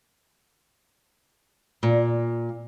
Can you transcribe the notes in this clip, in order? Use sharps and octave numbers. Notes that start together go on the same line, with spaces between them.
A#2